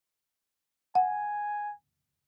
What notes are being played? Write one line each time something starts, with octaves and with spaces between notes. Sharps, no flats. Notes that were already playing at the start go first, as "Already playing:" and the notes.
F#5 G#5